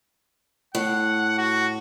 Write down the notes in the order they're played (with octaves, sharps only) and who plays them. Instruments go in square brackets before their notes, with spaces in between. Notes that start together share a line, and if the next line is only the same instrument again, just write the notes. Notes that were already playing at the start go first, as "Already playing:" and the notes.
[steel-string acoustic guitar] A2 [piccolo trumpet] F#5
[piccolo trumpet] F#4